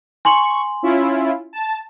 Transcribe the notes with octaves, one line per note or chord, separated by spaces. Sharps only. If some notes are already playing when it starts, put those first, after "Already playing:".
G#5 C6 C#6 F#7
C#4 E4 F4
A5